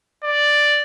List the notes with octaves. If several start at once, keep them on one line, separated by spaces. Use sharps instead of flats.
D5